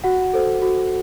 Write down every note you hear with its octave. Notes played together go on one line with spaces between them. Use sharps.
F#4 F#5
A4 C5
F#4